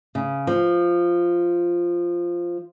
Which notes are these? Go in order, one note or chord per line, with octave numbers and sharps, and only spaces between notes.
C#3
F3